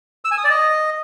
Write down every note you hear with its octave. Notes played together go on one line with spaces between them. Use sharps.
E6
G#5
D#6
D5
D#5